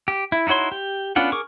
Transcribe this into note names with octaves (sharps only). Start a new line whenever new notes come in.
G4
E4
D#4 E4 F#4 C#5 C6
G4
B3 C#4 D4 F4 F#5
G#4 A#4 C#6 D6